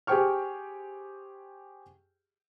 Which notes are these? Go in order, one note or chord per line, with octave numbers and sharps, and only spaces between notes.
G4 G#4 C5 G5 C#6 F6